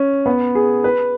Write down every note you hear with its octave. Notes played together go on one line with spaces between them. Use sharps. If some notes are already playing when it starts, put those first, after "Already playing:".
Already playing: C#4
B3
G#4
B4